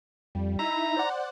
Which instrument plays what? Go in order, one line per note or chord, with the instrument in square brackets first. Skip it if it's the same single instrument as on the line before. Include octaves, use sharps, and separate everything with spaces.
[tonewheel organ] F2 [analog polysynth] G3
[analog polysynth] D#4 E4 E5 [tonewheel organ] A#5
[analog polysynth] C5 D5 F#5